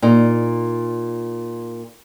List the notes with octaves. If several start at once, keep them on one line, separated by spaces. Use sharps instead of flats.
A#2 D#4